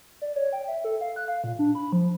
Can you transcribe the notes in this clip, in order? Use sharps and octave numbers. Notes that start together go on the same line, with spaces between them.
D5
C#5
G5
E5
A4
F5
F#6
F5
A#2
D4
B5
F3